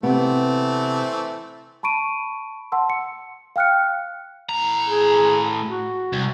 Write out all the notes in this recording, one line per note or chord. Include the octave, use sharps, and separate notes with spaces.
C3 E3 A3 B3 C4
A5 B5 C#6 D7 D#7
F#5 A5 C6 E6
C#7
F5 G5 F6 F#6 C#7
A2 A#5
G#4
F#4
C2